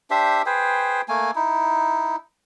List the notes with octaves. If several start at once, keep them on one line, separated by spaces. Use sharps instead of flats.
D4 G4 C5 E5
G#4 B4 C5 G5
A3 A#3 G#5
D#4 E4